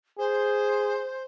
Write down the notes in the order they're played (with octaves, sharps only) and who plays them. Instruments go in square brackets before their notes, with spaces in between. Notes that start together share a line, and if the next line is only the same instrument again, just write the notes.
[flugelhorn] G#4 [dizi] C5